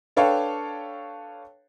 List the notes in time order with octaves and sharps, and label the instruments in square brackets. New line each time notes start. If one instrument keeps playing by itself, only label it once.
[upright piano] D4 A4 B4 C#5 F5 G5